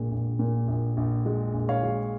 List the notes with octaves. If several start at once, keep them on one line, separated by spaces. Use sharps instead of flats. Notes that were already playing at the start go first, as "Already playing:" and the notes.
Already playing: A#1 A#2 G#3
A#1
A#2
A#1
A#1
G#3
A#1
C#5 F5
G#3